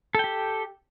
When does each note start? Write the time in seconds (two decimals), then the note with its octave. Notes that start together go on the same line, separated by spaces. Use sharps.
0.15 A4
0.19 G5
0.24 G4